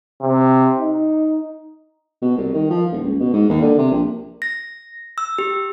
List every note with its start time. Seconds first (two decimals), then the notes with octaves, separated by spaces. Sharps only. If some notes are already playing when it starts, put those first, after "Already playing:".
0.21 C3
0.79 D#4
2.22 B2
2.37 C2
2.53 D#3
2.70 F3
2.92 D#1
3.04 C#2
3.20 B2
3.33 G#2
3.50 D#2
3.62 D3
3.78 C3
3.91 A#1
4.42 A#6
5.18 E6
5.38 G4